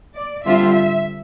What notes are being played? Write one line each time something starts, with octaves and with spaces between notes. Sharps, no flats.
D5
D3 G3 C4 F4 E5
E5